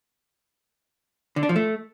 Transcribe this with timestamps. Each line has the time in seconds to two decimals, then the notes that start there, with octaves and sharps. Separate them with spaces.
1.36 D3
1.43 D4
1.49 F3
1.56 A3